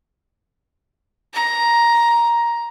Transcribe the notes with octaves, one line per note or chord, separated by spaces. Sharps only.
A#5